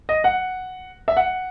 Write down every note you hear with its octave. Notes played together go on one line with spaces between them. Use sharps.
D#5
F#5
E5
F#5